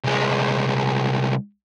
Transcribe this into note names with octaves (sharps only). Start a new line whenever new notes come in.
C2 G#3